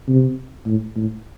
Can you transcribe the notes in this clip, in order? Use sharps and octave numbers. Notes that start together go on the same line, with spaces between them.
C3
A2
A2